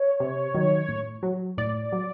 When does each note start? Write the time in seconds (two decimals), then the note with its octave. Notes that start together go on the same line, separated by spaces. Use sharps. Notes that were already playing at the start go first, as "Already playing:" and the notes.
Already playing: C#5
0.20 C3
0.54 D#3 F#3
0.89 A2
1.23 F#3
1.58 A2 D5
1.92 F#3